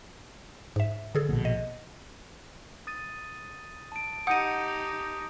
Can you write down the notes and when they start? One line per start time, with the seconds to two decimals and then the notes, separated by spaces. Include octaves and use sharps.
0.76 G#2 E5
1.15 D3 G#4 A4
1.29 A#1 B2
1.45 D#5
2.87 D#6 A6 D#7
3.92 A5 D7
4.27 D#4 G4 F#5 D#6 G6 C#7 D#7